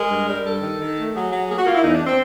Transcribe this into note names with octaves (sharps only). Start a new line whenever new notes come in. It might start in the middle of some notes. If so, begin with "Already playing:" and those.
Already playing: G#3 A#4
G2
G3
G2 A4
D#3
D#3
A3
F#3 G#4
F#3
A#3 G#4
F#4
A#3 F4
E4
E2 D#4
D4
C4